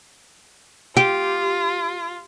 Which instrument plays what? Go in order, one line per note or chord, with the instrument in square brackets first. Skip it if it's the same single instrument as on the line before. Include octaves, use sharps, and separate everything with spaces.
[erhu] F4 [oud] G4